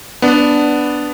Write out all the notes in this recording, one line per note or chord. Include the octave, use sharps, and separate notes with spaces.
B3 D4